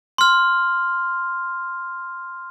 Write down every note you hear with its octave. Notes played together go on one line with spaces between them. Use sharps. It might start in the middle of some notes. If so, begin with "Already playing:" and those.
C6 F6